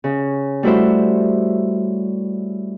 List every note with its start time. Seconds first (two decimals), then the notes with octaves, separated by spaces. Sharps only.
0.04 C#3
0.63 G3 A3 E4 F#4 C5 E5